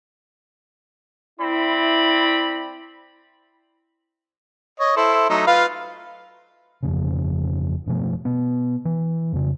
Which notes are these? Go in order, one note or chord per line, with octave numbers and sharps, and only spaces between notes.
C4 E4 D5 B5
C#5 D#5
E4 A4 C5
F#3 A3 D#4
F4 B4 F5
G1 F2 C#3
F#1 B2 F3 A3
B2 B3
E3
F2 C#3